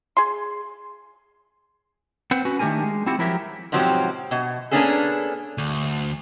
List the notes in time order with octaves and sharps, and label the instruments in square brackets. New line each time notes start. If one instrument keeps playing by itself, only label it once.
[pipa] G#4 C6
[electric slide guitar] C4 B4 C5 F#5
C#4 F#4 B4
D#3 A3 D4 G4 A#4 G#5
G#3
C4 E4 F#4 G4
F3 F#3 E4 G4 A#4 E5
[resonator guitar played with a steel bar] G#2 B2 F3 F#3 C4 G4
B2
A#3 B3 C#4 D4 G#4 A4
[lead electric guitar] D2